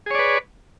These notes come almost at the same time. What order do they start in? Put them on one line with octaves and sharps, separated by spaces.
G#4 C#5 D5 B4